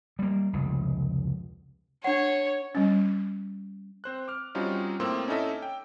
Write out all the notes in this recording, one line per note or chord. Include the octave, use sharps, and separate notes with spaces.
G3 A#3
F1 C#2
D4 C#5 F#5
G3 C#4
C4 C5 F#6
D6 F6
G3 C4 C#4 D#4 F4 F#4
A2 A#3 C4 C6 D6 E6
C#4 D#4 E4 A4 D#5 E5
G5